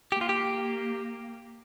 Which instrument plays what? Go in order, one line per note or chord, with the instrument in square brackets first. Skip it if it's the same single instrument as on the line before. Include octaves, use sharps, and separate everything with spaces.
[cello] A#3 [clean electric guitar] G4
[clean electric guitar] F4
G4